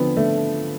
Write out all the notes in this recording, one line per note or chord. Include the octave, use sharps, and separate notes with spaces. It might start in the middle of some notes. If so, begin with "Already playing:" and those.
Already playing: D3 F3 B3 C4
D3 A3